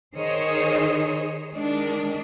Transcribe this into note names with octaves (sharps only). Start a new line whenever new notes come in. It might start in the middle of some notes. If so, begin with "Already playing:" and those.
D#3 G#4 C5 C#5 D#5
D#3 G#3 D4